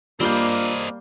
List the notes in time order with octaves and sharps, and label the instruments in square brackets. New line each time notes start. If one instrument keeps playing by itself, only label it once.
[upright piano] G2 F4 G6 [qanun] G3 C6 [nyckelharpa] A#3 [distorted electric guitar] C4 D#5